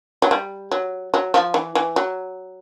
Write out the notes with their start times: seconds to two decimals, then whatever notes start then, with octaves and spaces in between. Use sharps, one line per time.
0.22 F#3
0.31 G3
0.71 F#3
1.14 F#3
1.34 F3
1.54 E3
1.75 E3
1.96 F#3